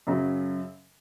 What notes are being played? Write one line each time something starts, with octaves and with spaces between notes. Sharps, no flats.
F#2 C#3 F#3